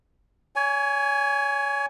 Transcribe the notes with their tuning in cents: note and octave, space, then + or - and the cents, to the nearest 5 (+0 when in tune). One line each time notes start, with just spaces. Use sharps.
C#5 +30 G#5 +0